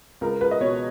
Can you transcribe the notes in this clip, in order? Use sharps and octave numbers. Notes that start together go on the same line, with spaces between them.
C#2 A#4
C#2 B4
D#5
B2 C#5